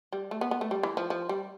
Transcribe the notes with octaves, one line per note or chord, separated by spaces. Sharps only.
G3
A3
B3
B3
A3
G3
E3
F3
F3
G3